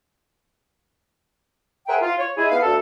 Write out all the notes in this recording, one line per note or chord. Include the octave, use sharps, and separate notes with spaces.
G#4 A#4 C5 E5 F#5 G5
F4
C#5
G#3 E4 G#4
B3 F5
D2 A4